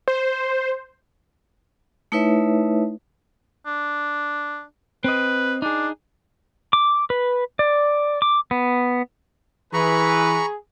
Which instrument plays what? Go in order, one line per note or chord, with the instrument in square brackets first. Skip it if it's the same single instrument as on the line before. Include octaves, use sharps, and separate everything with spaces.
[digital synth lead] C5
[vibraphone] A3 D#4 E4 B4 C#5 E5
[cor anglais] D4
[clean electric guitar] C4 D#5 [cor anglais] B4
[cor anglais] D4 [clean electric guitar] D#4 G#4
[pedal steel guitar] D6
B4
D5
D6
B3
[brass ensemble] E3 B4 [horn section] G#4 [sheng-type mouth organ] A#5 B5 C#6